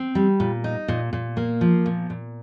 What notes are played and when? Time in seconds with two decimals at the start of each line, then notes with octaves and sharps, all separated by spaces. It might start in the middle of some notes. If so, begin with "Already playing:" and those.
Already playing: C4
0.15 G3
0.40 A#2
0.64 D#4
0.88 A#2
1.13 A#2
1.37 A#3
1.61 F3
1.86 A#2
2.10 A#2